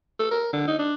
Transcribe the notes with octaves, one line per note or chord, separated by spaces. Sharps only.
A4
A#4
D3
D#4
D4